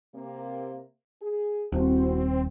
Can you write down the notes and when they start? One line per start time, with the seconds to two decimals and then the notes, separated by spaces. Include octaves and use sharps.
0.14 C3 A#3
1.22 G#4
1.72 D#1 C4 E4 F#4 C5